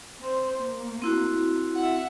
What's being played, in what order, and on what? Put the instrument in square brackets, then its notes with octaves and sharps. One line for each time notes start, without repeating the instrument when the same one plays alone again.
[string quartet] C4 C5
A#3
[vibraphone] C4 E4 F#4
[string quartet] E5 F#5